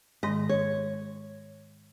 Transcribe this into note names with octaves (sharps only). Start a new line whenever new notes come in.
G#2 D#3 G#3 D#5
C#5